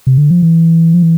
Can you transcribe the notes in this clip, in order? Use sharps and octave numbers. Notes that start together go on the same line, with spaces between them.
C3
D3
F3
E3
F3
E3